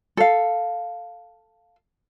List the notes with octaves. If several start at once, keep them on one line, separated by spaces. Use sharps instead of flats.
A4 F5